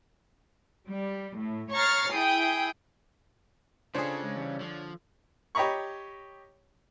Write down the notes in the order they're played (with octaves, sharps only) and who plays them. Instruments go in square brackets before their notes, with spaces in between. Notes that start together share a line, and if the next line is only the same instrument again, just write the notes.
[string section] G3
A2
C#5 A#5 C#6 F6 A6 C7
E4 G#4 G5 D#6
[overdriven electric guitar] C#3 [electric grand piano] D4 C#5 [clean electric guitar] F4 A4 [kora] G#4 C5
[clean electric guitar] G#3
E3 G3 C#4
[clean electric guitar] D3 [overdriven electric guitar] F3
[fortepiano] G4 C#5 D#5 A#5 B5 C#6